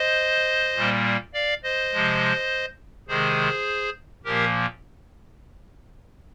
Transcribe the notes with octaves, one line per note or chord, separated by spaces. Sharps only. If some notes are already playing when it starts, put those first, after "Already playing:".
Already playing: C5 D#5
A#2 G3 A#3
D5 F5
C5 D#5
C3 F3 G#3
C3 D#3 G#3 G#4 C5
A#2 F3 A#3 G4 A#4